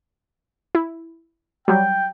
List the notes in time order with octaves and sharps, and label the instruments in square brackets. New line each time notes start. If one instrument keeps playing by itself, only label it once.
[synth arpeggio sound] E4
[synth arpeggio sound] F#3 G3 [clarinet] G5